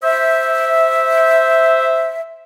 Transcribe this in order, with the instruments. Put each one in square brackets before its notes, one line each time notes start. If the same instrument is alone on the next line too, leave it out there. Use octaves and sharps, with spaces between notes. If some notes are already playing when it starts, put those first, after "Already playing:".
[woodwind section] C5 E5